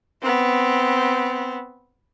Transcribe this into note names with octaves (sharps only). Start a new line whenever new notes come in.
B3 C4